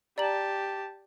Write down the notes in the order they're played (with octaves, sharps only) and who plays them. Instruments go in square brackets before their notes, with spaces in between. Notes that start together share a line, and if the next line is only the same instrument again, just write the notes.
[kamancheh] G4 A5 [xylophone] D5 A#5 F#7